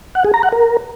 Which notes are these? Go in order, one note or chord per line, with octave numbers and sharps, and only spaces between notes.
F#5
G#4
A#5
F#5
A#4